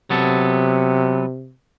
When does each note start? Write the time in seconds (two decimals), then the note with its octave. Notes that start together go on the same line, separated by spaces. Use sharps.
0.10 C3 F#3 B3 A4